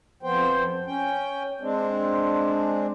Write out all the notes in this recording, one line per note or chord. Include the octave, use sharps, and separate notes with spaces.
F2 F3 B3 C5 G5
C#4 G5
G#3 C4 D4